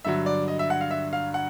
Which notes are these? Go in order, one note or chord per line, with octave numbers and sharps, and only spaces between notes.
G2 D3 F#3 E5
D5
D#5
E5
F#5
F5
E5
F5
F#5